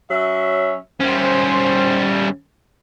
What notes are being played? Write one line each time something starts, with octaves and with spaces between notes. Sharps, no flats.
F#3 C#4 E5
G3 C#4 C5